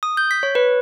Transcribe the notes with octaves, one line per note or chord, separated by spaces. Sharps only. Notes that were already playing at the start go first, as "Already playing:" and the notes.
D#6
G6
B6
C#5
B4